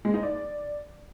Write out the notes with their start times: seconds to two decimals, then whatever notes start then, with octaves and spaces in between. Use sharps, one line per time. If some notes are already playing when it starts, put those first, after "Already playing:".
0.05 G#3
0.14 D#4
0.23 D5